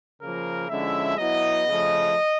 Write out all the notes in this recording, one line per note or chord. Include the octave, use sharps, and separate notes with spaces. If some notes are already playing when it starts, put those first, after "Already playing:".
C#3 F3 A#3 A#4
D3 F3 G#3 C#4 E4 E5
F#3 B3 E4 D#5
C#3 F3 A3